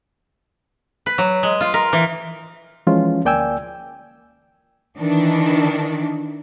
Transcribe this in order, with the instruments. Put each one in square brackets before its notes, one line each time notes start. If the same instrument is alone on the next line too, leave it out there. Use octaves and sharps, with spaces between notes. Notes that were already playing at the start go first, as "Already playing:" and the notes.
[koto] B4
F#3
G#3
F4
A#4
E3
[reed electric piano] E3 F3 G#3 C#4 F4
D2 A#3 D5 G5 G#5 E6
[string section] D#3 E3 D4